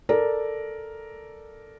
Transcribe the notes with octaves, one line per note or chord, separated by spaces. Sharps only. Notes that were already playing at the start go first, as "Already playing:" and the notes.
A4 A#4 D5